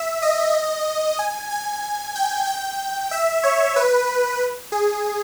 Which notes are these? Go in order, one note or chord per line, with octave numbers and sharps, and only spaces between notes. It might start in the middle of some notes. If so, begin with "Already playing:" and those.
Already playing: E5
D#5
G#5
G#5
G5
G5
E5
C#5
B4
G#4